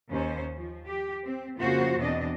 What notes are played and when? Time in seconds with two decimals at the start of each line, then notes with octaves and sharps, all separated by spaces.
0.10 D#2 C#4 C5
0.57 F3
0.87 G4
1.24 C4
1.59 F2 C#3 A#3 F4 F#4 C5
1.99 E2 B2 C4 D4 D5 D#5